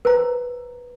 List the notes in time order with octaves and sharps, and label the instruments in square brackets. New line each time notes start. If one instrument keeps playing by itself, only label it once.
[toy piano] B4 C5 A#5